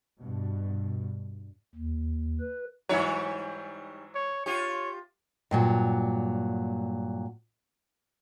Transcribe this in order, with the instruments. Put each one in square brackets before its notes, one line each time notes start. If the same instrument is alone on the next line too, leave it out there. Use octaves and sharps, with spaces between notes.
[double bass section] G2 B2
[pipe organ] D#2
B4
[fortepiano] G#2 E3 F#3 [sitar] G3 D#4 C#5
[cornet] C#5
[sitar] F4 G4 [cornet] C#5
[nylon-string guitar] G2 A#2 F#3